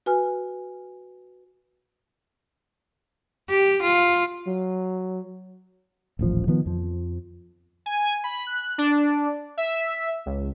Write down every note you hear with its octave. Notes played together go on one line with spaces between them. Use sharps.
F#4 B4 G#5 F6
G4
F4
F#3
D#1 A1 F3
D#3 F3 B3
F2 F3
G#5
B5
F#6
D4
E5
C#2